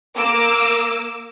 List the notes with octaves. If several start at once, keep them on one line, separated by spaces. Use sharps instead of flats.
A#3 D6 E6